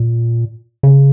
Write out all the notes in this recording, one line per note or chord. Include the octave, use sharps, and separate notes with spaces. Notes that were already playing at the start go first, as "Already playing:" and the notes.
Already playing: A#2
C#3